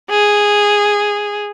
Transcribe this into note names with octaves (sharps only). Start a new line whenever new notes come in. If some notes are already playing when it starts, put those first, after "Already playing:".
G#4